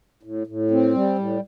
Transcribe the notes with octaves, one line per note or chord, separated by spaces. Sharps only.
A2
A2
C4
G3
A2